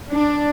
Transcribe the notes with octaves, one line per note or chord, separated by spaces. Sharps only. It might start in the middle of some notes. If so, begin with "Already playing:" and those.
D4